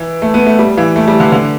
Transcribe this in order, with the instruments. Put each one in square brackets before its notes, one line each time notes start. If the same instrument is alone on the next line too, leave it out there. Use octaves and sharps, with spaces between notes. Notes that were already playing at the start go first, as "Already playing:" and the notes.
Already playing: [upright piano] E3
A3
B3
A3
G3
E3
A3
G3
D3
D3